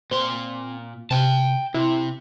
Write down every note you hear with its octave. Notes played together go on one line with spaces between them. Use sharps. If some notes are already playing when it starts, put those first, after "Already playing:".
A#2 C4 C6
C3 G5 A5
C3 E4